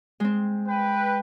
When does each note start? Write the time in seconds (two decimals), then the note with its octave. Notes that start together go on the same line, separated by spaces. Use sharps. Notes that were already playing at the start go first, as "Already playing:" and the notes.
0.20 G#3 C4
0.68 B4 G5